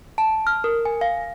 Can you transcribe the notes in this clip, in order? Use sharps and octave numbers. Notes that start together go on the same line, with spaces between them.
A5
F6
A#4
G#5
F5